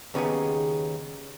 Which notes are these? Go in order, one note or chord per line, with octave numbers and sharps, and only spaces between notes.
D#2 C#3 B3 D#4 G#4